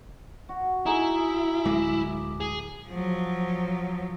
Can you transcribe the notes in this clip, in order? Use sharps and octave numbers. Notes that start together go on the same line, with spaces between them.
F#4
D#4 E4 G#4
D1 G#3 D6
G#4
F3 F#3